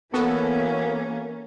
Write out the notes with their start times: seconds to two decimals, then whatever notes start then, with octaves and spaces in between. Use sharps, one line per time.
0.13 E3 A#3 B3 C#4 F#4 A4